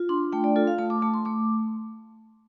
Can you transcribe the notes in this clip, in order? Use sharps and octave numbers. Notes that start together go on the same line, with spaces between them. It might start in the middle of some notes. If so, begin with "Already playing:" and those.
Already playing: F4
D4 C6
A3 G5
D5
F4 A4
F5
A3 A5
D6
A3 A5
C6
A3 D6